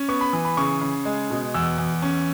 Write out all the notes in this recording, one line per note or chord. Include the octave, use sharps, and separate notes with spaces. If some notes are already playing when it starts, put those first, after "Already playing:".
Already playing: C#4
B3 C#6
B5
E3
B5
C#3 C#6
C#3
G#3
B2
E2 E6
E2
C#4